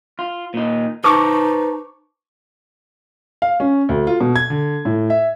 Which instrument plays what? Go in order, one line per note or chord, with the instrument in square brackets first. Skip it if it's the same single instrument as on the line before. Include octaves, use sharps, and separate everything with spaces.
[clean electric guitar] F4
A#2 D#4
[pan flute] D#4 [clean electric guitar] B4 C5 A5 [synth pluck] C#6 D6
[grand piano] F5
C#4
D2
F4
B2
G#6
D3
A2
E5